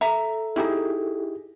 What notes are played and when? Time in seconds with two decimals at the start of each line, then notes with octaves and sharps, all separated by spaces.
0.01 A4 E5 A#5
0.56 C#4 D#4 E4 G4 G#4